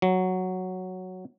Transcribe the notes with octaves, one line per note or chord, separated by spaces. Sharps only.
F#3